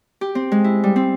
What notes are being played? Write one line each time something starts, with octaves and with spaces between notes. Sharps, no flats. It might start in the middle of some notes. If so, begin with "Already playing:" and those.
G4
C4
G#3
E4
G3
C4